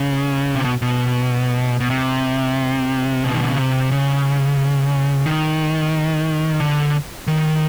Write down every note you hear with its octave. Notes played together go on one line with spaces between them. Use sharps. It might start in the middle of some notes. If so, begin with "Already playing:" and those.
Already playing: C#3
C3
B2
B2
B2
C3
B2
D#3
D3
C#3
C3
C#3
D#3
D3
D#3